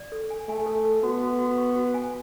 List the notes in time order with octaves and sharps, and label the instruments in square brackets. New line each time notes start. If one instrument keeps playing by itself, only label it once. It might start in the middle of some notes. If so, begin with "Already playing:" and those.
Already playing: [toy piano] D5
A4
G#5
[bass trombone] A3 [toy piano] G#5
[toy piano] A4
A4
[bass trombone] B3 [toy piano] F#4
[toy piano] F#4
F#4
C#6
F#4
G#5